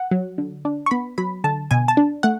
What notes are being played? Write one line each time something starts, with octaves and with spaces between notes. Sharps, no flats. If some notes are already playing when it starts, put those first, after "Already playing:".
Already playing: F#5
F#3
D3
D4
C#6
B3 B5
F#3 B5
D3 A5
B2 G#5
A5
D4
A3 F#5